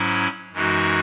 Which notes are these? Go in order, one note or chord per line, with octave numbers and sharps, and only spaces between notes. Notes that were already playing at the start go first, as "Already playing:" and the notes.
Already playing: G#2 F#3 C#4 E4
F#2 E3 G#3 D#4 F#4